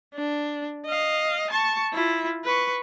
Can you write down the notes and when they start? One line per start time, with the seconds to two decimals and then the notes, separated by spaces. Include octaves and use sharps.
0.15 D4
0.86 D#5 F5
1.51 A5 C#6
1.93 E4 F4
2.45 B4 C#6